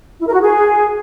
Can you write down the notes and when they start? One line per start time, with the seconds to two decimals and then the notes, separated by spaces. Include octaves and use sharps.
0.20 E4
0.27 A#4
0.34 F#4
0.41 G#4